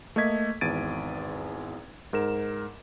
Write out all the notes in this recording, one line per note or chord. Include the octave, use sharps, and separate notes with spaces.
A3 A#3 A4 D#5 G#6 B6
G#1 E2 G#6 A6 D7 D#7
G#2 A#4 E7